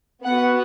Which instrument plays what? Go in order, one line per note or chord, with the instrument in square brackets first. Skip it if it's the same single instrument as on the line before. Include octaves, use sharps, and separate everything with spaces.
[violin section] B3 F#4 F#5